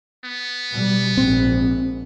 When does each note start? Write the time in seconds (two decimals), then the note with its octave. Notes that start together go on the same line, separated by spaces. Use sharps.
0.25 B3
0.72 B2 G3
1.17 A#1 G#2 C4